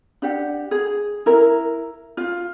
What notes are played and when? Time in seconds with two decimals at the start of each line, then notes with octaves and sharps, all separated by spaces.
0.22 D4 G4 F#5
0.71 G#4
1.26 E4 A#4
2.17 F4